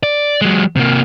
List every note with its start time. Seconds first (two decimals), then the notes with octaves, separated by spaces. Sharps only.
0.03 D5
0.41 F#3 G#3
0.76 C3 A#3